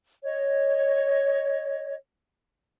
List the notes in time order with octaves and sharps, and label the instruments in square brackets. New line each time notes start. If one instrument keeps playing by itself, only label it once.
[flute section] C#5 D#5